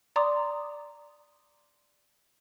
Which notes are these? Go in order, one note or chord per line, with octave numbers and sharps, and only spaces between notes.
D5 A#5 C6 D6 D#6